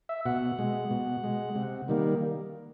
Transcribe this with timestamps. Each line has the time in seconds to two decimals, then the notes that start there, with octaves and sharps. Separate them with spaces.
0.09 E5
0.26 B2 F#5
0.59 G#3
0.91 B2
1.24 G#3
1.56 C3
1.88 D#3 G3 A#3